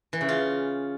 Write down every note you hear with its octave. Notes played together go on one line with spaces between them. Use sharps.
E3
C#3
F4